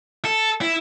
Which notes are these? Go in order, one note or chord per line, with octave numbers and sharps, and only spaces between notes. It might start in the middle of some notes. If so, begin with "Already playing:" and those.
A4
E4